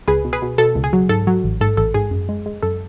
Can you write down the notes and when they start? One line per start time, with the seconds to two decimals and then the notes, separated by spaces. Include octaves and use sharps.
0.08 C#2 G#4 B4
0.25 B2
0.33 G#4 B4
0.42 B2
0.58 B2 A4
0.75 C#2
0.84 G#4
0.93 F#3
1.09 G#2 A4
1.27 F#3
1.44 A1
1.61 G#2 A4
1.77 A1 A4
1.94 G#2 G#4
2.11 F#2
2.29 G#3
2.46 G#3
2.63 F#2 A4